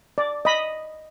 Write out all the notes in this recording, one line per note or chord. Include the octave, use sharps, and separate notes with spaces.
D5
D#5 B5